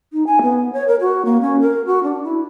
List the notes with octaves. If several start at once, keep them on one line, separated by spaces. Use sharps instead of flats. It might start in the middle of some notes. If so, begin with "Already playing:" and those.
D#4
G#5
B3
C#5
A#4
F#4
A#3
C#4
A#4
F#4
D4
E4